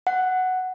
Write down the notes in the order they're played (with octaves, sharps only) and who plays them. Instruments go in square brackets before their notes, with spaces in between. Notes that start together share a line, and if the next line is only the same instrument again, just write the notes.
[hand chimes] F#5